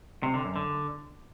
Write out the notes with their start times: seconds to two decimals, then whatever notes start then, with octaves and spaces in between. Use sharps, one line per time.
0.23 C3
0.34 D3
0.45 F#2
0.56 D3